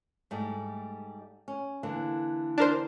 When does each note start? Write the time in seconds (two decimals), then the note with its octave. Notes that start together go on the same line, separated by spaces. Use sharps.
0.31 G#2 G3 A3
1.48 C#4
1.83 D3 E3 A#3
2.58 D4 A#4 C5